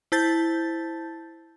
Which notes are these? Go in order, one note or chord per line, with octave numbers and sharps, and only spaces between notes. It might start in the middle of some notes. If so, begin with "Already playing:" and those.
E4 C5 A5 G6 A6